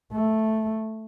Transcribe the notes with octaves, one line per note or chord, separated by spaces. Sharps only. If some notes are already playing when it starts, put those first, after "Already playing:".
A3